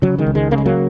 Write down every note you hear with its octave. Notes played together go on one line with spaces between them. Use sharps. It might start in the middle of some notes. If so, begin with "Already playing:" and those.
C#3 F#3
D#3 G#3
C#2
D#3 G#3
C#3 A#3
G#3
F#3 A#3